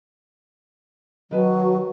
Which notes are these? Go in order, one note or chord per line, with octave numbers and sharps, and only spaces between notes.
D#3 F#3 B4 A5